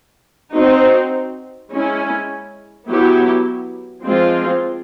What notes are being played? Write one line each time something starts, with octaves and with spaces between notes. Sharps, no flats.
C4 D#4 F#4
G#3 C#4 E4
F#3 B3 E4 G4
F3 G#3 C4 F4